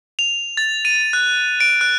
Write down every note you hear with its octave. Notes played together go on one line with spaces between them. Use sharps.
F7
A6
D#7
F#6
D7
F#6